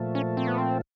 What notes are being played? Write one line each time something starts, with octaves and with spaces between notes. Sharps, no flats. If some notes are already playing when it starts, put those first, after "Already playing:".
Already playing: A#2 F3 A3
C#4
C4
B3
C4